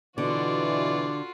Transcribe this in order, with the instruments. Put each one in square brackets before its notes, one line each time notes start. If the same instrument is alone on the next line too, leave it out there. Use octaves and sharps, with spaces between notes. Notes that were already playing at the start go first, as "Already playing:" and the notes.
[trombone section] B2 E3 [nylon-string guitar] D3 [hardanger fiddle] F4 F#4 [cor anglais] D5